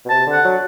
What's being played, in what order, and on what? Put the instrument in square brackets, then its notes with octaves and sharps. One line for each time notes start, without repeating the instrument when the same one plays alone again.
[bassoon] B2
[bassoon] C3 [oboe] A5
[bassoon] D3
[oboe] F#5
[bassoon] F#3